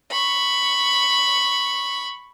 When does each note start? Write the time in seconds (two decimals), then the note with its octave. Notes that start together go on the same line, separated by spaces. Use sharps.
0.11 B5 C#6